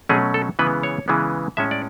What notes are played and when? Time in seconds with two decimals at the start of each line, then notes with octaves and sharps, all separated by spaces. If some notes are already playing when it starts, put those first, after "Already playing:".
0.09 B2 F#3 A3 C#4 G#4
0.34 A4
0.59 C#3 E3 G#3 B3 B4
0.83 C#5
1.08 C#3 E3 G#3 B3
1.57 A2 G#3 C#4 E5
1.71 D5